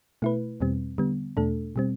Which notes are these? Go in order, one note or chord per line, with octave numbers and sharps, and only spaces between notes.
B2 A3 E4 B4
E2 B2 G3 C4
D3 G3 B3
E2 B2 A3 D4 A4
B2 G3 C4